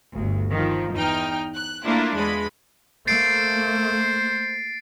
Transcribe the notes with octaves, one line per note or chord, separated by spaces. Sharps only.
G1 D2
D#3 F3
E2 D#4 G5 F6
F#6
A3 A#3 D4 E4 F4
E2 G#3 F4 B5
A3 A#3 C5 A6 C7 D7